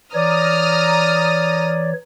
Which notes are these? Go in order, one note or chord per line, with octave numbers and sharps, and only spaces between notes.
E3 C#5 D5 A#5 D#6 F6